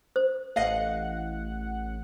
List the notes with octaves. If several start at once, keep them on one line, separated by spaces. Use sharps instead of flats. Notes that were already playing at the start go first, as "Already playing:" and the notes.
C5
A1 D#5 F5 F#5